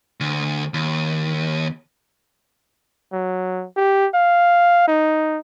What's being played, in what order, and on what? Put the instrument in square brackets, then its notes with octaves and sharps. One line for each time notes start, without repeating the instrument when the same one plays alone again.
[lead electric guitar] D2
D#2
[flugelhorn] F#3
G4
F5
D#4